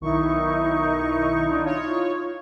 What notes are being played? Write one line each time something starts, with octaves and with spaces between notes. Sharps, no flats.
B1 D#3 D#4 E4 C#6
D4 F4
F4 C#5